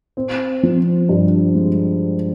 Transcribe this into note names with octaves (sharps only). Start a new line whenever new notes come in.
C4
F3
G2
G#3